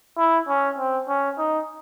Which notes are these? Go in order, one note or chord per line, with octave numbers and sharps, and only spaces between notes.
E4
C#4
C4
C#4
D#4